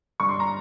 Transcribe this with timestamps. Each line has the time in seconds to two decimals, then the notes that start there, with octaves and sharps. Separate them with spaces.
0.20 G2 C#6
0.29 C6
0.40 A#5